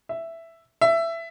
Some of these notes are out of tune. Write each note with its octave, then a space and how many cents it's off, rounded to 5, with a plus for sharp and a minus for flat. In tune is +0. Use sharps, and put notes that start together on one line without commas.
E5 +5
E5 +15